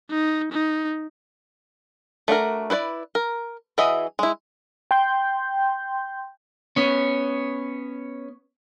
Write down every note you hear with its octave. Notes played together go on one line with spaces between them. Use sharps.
D#4
D#4
A3 D4 F#4 A#4
E4 B4 C5 D5
A#4
E3 F#4 G#4 D#5 E5
G#3 E4
G5 C6 G6
B3 C#4